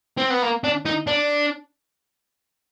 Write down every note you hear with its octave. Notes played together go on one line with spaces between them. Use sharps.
C4
B3
A#3
D4
D#4
D4